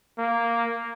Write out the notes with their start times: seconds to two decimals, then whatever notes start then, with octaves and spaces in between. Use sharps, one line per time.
0.18 A#3